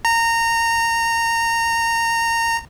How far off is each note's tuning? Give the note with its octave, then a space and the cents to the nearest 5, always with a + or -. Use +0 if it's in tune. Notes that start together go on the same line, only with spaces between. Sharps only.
A#5 -20